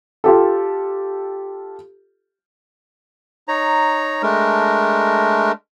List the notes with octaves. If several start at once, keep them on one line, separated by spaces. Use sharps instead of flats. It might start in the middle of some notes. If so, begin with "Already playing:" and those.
F4 G4 A4
D#4 C#5 A#5
G#3 A3 D4 A#4